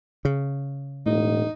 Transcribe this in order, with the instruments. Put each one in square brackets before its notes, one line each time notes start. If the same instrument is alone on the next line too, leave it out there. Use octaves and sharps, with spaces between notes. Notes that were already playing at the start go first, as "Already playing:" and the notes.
[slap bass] C#3
[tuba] E1 [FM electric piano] A2 [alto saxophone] D#4